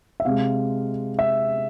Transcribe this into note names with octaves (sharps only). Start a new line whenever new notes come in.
E5
C3 G#3 F5
E5